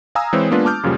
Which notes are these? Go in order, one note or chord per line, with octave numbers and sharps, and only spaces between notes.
F5 G#5 A#5 D#6 E6
E3 G#3 C4 C5 C#5
G#3 A#3 B3 D4 F4 B4
A5 D6 F6 G6
F#2 A#2 C#3 F3 G3